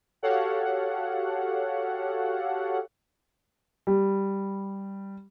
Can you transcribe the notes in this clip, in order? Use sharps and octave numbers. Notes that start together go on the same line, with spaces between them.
F#4 G4 A4 C#5 F5 F#5
G3